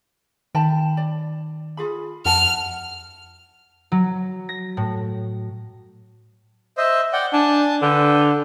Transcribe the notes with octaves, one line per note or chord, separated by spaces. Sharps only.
D#3 G5 A5 B5
D5
F4 G#4 B5
F2 E4 F#5 A5 F6
F#3
A#6
A2
C5 D#5 E5
D5 F#5 G5
D4 G#5 A5
D3 B4 G5